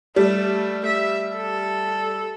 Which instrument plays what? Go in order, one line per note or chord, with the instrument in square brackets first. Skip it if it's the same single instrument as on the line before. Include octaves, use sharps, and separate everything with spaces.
[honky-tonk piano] G3 [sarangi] A3
[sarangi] E5
A4